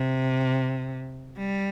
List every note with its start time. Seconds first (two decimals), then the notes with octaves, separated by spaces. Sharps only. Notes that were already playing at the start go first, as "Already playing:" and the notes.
Already playing: C3
1.38 G3